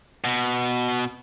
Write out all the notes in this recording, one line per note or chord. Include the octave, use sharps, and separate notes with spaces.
B2